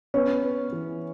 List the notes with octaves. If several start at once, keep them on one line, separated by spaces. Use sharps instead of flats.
B3 C#4
B3
E3